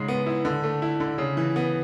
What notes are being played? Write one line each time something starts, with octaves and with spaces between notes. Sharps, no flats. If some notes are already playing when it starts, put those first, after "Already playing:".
Already playing: G#2 C#3 G#3
B3
E4
D3
A3
E4
D3
C#3
E3
B3